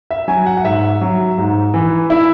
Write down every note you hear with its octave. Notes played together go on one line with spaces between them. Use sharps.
E5
F#3 G#5
F#5
F#5
G#2 E5
F#3
G#2
E3
E4